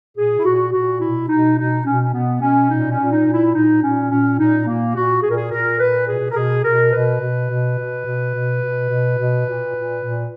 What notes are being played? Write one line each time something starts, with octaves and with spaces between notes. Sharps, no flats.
A#2 G#4
E4
A#2 F#4
A#2 F#4
B2 E4
B2 D#4
B2 D#4
B2 C#4
C#4
B2 B3
B2 C#4
A#2 D#4
C#4
A#2
D#4
A#2
E4
A#2 D#4
A#2 C#4
A#2 C#4
A#2 D#4
A#2 A#3
A#2 F#4
A#2 G#4
A#4
G#4
A#2 A#4
A#2 B4
B2 G#4
A#4
B2 G#4
B2 A#4
B2 B4
B2
B2
B2
B2
B2
B2
B2
B2
A#2
A#2
A#2